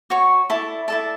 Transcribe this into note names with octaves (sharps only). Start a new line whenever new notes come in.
F#4 C#5 C#6
E4 A4 D5 A5
E4 A4 D5 A5